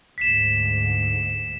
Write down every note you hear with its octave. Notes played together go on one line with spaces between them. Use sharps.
D2 G#2 B6 C7 E7